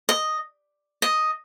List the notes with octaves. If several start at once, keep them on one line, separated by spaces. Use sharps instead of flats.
D#5
D#5